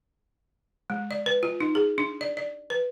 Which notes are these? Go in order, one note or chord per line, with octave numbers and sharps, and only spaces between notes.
G#3
D5
B4
F4
D#4
G#4
D4
D5
D5
B4